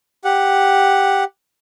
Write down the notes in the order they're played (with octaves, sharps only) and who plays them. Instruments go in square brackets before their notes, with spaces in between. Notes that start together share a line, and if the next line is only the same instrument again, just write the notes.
[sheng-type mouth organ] G4 F#5